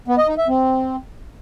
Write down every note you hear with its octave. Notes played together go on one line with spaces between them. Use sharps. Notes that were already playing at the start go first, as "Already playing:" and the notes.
B3
D#5
D#4
E5
C4